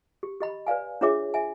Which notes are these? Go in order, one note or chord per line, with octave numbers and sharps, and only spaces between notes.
G4
G4 D#5 B5
B4 D5 F5 G#5
D4 F4 G#4 C#5 E5 D6
E5 G#5